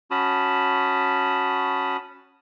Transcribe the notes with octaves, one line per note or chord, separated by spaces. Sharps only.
C#4 F#4 A5 B5 D#6